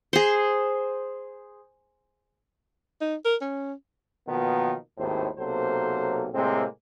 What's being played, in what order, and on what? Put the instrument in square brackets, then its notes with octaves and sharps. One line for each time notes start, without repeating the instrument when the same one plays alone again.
[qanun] G#4 C5
[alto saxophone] D#4
A#4
C#4
[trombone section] B2 D#3 F3 F#3 A#3 B3
G#1 D#2 A2 D#4 C5
B1 C3 F#3 A#3 A4 C5
A2 C3 G#3 A#3 C4